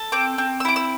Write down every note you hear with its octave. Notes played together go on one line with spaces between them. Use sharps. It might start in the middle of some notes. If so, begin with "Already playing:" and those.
Already playing: A4
C4 D6
C4
E6
E4 D6
E6